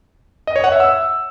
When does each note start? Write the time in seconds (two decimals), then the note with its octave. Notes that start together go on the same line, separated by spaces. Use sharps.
0.47 D#5
0.56 C#5
0.64 F#5
0.72 E5
0.80 E6